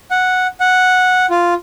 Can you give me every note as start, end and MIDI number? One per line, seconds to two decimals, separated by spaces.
0.11 0.47 78
0.60 1.26 78
1.30 1.54 65